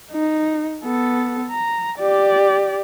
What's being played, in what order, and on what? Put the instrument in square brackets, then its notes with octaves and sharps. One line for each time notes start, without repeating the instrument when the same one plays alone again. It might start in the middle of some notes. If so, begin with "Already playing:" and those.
[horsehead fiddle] D#4
B3 A4
A#5
G4 D5